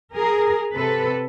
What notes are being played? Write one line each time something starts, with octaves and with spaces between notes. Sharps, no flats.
G#4 A#4
C3 A4 B4